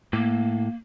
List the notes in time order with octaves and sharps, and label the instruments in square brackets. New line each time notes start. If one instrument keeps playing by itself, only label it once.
[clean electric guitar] A2 [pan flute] A#3